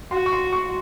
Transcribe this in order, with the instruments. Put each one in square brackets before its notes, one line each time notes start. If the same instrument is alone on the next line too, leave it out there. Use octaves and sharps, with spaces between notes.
[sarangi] F#4 [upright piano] C6
[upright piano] C#6
C6
C#6